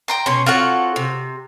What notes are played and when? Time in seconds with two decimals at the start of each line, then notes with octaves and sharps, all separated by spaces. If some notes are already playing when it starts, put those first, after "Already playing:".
0.08 G5 A#5 C6
0.26 B2 C#4 C6
0.46 C4 F4 F#4 A4 C#5 F#5
0.96 C3